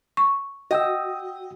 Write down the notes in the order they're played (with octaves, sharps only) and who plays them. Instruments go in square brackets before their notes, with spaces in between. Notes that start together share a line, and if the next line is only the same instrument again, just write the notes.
[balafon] C#6
[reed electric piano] F#4 G5 E6 [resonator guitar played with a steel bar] D#5